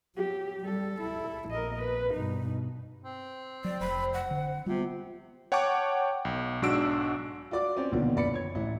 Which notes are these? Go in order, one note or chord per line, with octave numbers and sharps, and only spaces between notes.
F#3 G4
G3 A4
E4
A#1 A#4 D#5
B4
G2 B2 D#4
C4
F#3 D5
F1 C5 B5
F#5
D3
C3 G3 B3 F4
C#5 F#5 G5 A5 C#6 D6
B1
B1 G#2 D4 F#4 E6 D7
F4 F#4 D5 D6
C4 C#4 D5
B1 A#2 D3 D#3 F3 B3
F#1 B3 D5 B5 C#7
C#5 G#6
A1 E4